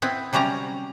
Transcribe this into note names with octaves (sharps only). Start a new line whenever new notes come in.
B3 C4 E4
C3 F#3 G3 C#4 A#5